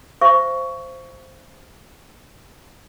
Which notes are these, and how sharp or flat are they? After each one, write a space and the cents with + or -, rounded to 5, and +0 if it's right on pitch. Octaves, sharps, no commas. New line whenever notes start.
C5 +0 F5 -45 C#6 +15